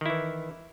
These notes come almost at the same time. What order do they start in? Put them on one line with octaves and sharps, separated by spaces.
D#3 E4 E3